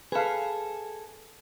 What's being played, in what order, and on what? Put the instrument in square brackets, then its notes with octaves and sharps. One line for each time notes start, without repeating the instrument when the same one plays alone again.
[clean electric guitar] G#4 A4 [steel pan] B4 F5